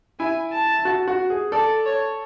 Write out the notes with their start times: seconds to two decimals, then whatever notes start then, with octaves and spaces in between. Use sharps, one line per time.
0.19 E4 G#5
0.53 A5
0.85 F#4
1.08 F#4
1.30 G#4
1.52 A4 D5
1.86 C#5